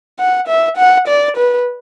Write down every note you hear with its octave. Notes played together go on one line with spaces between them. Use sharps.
F#5
E5
F#5
D5
B4